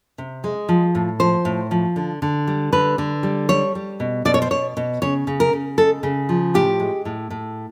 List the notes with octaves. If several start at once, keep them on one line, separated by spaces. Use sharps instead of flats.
C3
G#3
F3
A2
F3 C5
A2
F3
D3
D3
G3
D3 B4
D3
G3
G3 C#5
G3
B2
B2 D5
C#5
C5
B2 C#5
B2
C#3 C#5
C#3
A#4
C#3
G#3 A4
C#3
F3
A2 G4
G#3
A2
A2